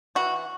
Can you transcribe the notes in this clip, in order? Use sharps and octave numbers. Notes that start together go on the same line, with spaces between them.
E3 F#4